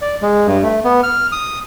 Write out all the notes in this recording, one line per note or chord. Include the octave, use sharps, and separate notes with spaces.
D5
G#3
G2
A3
B3
F6
D#6